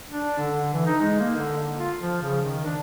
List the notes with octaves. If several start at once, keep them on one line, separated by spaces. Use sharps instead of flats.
D4
D3
E3
D#4
G#3
A#3
D3
F4
F3
C#3
D#3
D4